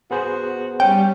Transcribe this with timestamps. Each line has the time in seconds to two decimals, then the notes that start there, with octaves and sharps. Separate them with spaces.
0.11 B3 F#4 G#4 C5
0.80 G3 C#4 G5